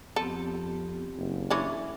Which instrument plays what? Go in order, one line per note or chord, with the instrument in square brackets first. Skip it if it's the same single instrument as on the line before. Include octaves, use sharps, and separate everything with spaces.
[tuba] F2 [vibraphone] B3 C4 G4 [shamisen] A4
[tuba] F#1
[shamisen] E3 C#4 D4 [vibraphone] A4 E5